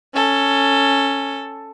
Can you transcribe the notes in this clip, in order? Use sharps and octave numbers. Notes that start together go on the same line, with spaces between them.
C#4 A4